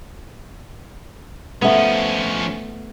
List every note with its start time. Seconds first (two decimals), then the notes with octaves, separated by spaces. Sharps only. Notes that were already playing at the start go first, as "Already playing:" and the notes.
1.62 F3 A3 B3 C#4